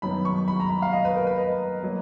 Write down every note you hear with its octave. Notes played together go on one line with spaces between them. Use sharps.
F#2 D#3 F#3 B3 B5
C#6
B5
A#5
B5
F5
D#5
B4
A#4
B4
D#5
F#3 A#3